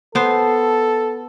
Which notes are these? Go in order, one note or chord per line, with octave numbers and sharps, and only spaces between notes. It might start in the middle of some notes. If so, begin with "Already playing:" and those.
B3 A4 C5